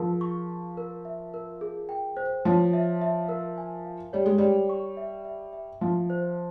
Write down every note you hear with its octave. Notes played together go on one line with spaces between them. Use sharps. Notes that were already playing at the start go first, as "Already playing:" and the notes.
Already playing: F3 G#4 A#4
C#6
C#6
A#4
E5
A#4
G#4
G5
C5
F3 C#5
E5
E5
A#4
G#5
F5
G3 C#5
G#3
G3 C#5
C#6
E5
E5
E5
F3 F5
C5